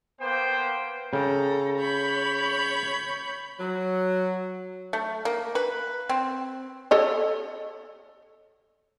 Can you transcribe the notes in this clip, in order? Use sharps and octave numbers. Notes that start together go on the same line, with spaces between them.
A#3 B3 C5 G5
C#3 A4 G5 A#5
C#5 B5 G6
F#3
A3
A#3
B4
C4
A4 C#5 D#5